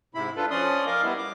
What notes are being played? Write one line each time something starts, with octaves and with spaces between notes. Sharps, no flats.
G#2 C3 E4 B5
D4 F4 A4 B4
F3 C#4 D5 C6 D#6
A#4 D#5 F5 D6
G3 B3 E4
D6